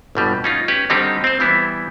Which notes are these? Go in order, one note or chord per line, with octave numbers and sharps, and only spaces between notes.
G1 B2 G3
C#4 D#4 F4
C#4 G4 B4
D3 D#3 G3 C4 D#4 G4
C4 C5
E3 G3 B3 E4